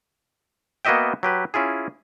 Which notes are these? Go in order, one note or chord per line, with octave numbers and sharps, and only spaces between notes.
A#3 B3 F#4 D#5 E5 G5
F#3 G4 B4
C#4 E4 F4 G#4